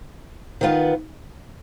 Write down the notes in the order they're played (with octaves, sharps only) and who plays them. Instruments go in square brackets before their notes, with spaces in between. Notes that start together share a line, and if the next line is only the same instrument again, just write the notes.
[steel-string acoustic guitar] D#3 B3 F4 B4